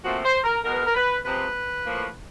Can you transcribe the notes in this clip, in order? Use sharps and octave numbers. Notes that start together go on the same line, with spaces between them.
A#2 F3 A3 C4 F#4
C5
A#4
B2 G#3 B3 A#4
A#4
B4
C3 F3 G#3 C4 B4
A2 F3 A#3